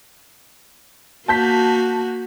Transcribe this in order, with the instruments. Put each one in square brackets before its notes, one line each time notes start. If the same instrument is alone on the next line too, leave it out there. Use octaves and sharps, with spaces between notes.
[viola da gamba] A#3 F#4 [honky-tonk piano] A5 G6 B6